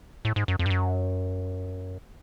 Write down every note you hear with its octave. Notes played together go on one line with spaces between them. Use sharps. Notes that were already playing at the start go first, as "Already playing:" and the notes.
A2
G#2
F#2
F2
G2
F#2